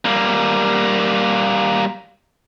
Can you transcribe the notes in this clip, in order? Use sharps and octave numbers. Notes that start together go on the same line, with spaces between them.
G3 A#3